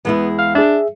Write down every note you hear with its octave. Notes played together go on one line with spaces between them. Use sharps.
E2 G#3 B3 E4
F5
D4 G#4 E5